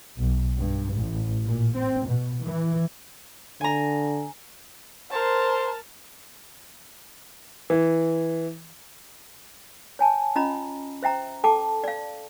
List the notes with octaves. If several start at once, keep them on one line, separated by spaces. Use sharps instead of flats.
B1
G2
A1
A#2
C4
B2
E3
D3 G#5 A#5
A#4 C5 A5
E3
C#5 G#5 A5
C#4 F4 D#5 A#5 B5
C5 E5 G5 A#5
A4 G5 A5 D6
D5 F5